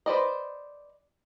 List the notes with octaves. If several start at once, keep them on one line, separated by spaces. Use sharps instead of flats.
B4 C5 D5 D#5